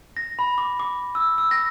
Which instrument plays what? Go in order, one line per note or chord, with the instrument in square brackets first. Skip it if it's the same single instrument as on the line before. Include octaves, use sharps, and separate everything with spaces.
[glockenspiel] A#6
B5
D6
D6
E6
E6
A#6